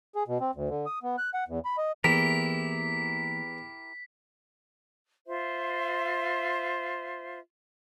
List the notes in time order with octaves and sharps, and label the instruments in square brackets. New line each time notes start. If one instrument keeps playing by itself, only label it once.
[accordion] G#4
B2
C4
D2
D3
D#6
B3
F#6
F#5
E2
B5
D#5
[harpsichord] E2 [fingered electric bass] E3 A#3 [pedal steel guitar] E4 G4 A#4 [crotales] B6
[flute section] F4 C5 E5